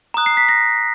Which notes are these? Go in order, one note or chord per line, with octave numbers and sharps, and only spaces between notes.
A#5 D#6 F#6
C7
B6
A#6